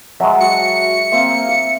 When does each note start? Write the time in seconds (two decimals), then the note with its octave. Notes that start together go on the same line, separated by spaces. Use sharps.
0.20 F#3 G#3 E5 A5
0.41 F#4 C#7
1.12 A#3 C4 E5